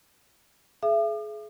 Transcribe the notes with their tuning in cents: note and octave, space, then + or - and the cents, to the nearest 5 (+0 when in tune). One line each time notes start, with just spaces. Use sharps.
G#4 +35 E5 +35 D6 +45